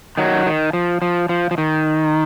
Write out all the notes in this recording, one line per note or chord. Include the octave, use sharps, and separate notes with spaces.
D#3 F#3
D#3
F3
F3
F3
F3
D#3